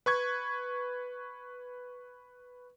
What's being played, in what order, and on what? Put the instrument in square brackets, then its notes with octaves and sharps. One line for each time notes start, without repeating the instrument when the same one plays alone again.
[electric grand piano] B4 C#6 G#6